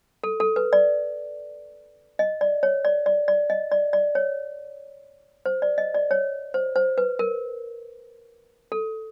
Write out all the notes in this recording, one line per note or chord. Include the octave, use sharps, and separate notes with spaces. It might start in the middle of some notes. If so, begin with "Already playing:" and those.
A4
A4
B4
D5
D#5
D5
C#5
D5
D5
D5
D#5
D5
D5
C#5
C5
D5
D#5
D5
C#5
C5
C5
B4
A#4
A4